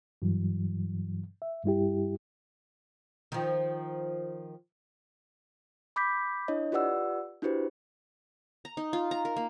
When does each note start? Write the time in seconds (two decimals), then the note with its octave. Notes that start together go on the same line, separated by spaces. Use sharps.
0.22 G2 E3 F#3
1.42 E5
1.64 G2 G3 E4 G4
3.32 D#3 F3
5.96 B5 D6 G6 B6
6.48 D4 E4 C#5 D#5
6.72 F4 G4 B4 D5 F#5 E6
7.42 D4 E4 F#4 G4 B4 C5
8.65 A#5
8.77 D#4
8.93 F4
9.11 A#5
9.25 A#4
9.36 A#3